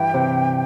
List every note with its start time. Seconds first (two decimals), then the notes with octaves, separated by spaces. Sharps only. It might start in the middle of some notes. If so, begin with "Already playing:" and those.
Already playing: G2 E3 G5
0.14 C3